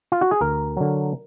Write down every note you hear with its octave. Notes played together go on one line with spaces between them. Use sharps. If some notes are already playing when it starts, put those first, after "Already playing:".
F4
F#4
G#4
D2 A#4
D3 F#3